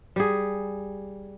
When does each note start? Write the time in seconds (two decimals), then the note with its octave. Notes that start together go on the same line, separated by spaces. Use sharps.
0.16 G3 G#4